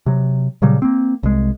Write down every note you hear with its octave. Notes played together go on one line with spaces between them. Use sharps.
C3 F#3
A#2 C#3 F#3 G3
A#3 C4
C2 G#3